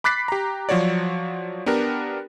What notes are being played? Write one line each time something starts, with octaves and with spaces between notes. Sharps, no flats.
B5 D6 F#6 A6 B6 C7
G4 A#5
F3 F#3 F#4 C#5 D5
B3 D4 G4 A#4